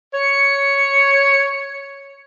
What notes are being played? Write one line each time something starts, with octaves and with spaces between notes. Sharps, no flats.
C#5 C#7